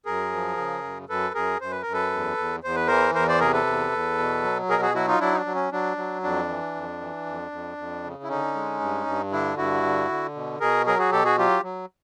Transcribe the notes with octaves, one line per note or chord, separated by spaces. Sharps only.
F#2 G#4 A#4
F3
C#3
F#2
F#2 A4 B4
F#2 G#4 A#4
F#2 C5
B4
F#2 A#4
A4 B4
E2
E2
E2 C5
B4
E3 A#4 C5
E2 A#4 C5
C5 D5
C3 G#4 A#4
A4 B4
E2
E2
B2
F#3
B2 G#4 A#4
F#4 G#4
F#3 E4 F#4
D#4 F4
F#3 D4 E4
D#4
D4
F#3
C#4
F#3 D4
F#3
F2 D4
E3
F2
E3
F2
F2
F2
C#3
E4
D3 C#4 D#4
G#3
G2
G2
D3 D4 E4
G2 E4 F#4
D3
D3
B2
B2 G#4 A#4
F#3 G#4 A#4
F#4 G#4
B2 G4 A4
F#4 G#4
F#3 F4 G4
F#3